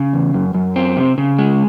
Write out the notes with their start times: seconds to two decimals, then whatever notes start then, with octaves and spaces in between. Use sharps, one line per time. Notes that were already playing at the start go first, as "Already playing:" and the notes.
Already playing: C#3
0.13 E2
0.34 F#2
0.54 F#2
0.76 C4
0.97 C3
1.18 C#3
1.39 G#3